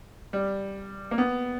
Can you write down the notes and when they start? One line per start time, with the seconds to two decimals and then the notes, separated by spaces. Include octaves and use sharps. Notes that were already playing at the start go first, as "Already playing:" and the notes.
0.33 G3
1.11 A#3
1.18 B3